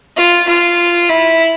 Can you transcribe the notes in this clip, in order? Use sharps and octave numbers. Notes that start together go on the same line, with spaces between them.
F4
F4
E4